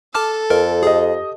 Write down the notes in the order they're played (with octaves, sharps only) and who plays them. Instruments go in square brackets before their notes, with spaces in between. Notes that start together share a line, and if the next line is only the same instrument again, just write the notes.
[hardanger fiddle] A4 [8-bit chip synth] A5 D6 F6
[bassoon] F2 [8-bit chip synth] A#4
[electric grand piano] G4 D#5 [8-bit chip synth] G#4